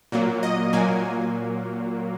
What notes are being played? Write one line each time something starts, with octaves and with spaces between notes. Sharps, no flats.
A#2 F#3 A#3
D#5
A#2 F#3 A#3 G#5